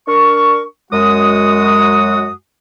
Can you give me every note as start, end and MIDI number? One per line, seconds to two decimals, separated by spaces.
0.07 0.62 62
0.07 0.62 70
0.07 0.62 85
0.92 2.30 42
0.92 2.30 56
0.92 2.30 66
0.92 2.30 87